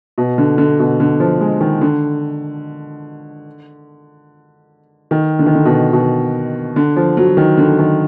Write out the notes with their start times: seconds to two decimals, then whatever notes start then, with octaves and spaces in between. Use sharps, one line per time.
0.18 B2
0.38 D3
0.58 D3
0.79 B2
1.00 D3
1.20 F3
1.41 G#3
1.61 D#3
1.81 D3
5.11 D#3
5.39 D3
5.46 D#3
5.55 D3
5.65 B2
5.93 B2
6.76 D3
6.96 F3
7.17 F#3
7.37 D#3
7.58 D3
7.79 D#3